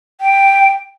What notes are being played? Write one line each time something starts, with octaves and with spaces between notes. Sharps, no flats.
G5